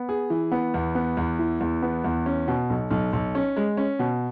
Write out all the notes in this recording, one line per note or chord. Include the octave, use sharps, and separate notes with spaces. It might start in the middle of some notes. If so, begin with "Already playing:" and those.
Already playing: B3
G#4
E3
B3
E2
B3
E2
E3
E2
B3
E2
C#4
B2
B1
B1
B1
C#4
G#3
C#4
B2